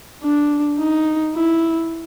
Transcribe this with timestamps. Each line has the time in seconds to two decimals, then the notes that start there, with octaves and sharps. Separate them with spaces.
0.23 D4
0.80 D#4
1.36 E4